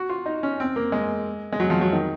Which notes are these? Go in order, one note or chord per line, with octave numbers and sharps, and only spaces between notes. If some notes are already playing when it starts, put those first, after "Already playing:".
Already playing: F#4
F4
D#4
C#4
C4
A#3
G#3
G#3
F#3
F3
F#3
D#3